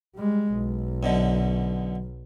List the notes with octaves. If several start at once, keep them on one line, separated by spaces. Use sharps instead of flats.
G3 G#3
B1
F#2 B2 D3